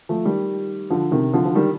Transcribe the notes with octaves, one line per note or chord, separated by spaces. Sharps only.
F3 A3
D#3 G3
D3 F3
C3 D#3
D3 F3
F3
D#3 G3